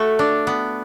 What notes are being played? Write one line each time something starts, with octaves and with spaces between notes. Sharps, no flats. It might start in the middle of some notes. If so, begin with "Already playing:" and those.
Already playing: A3 F#4
D4
B3